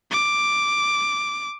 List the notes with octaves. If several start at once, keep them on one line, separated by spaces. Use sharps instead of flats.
D6